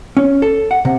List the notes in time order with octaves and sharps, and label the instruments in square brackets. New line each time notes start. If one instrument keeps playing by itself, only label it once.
[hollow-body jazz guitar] C#4
A4
F#5
C3